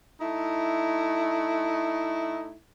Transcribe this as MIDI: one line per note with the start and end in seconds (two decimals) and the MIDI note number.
0.20 2.53 57
0.20 2.53 63
0.20 2.53 64